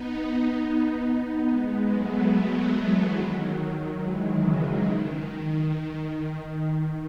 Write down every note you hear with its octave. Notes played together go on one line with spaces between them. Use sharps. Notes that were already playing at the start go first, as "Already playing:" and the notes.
Already playing: B3 D#4
G#3 B3
F#3 A3
F#3 A3
E3 G#3
D#3 F#3
E3 G#3
C#3 E3
D#3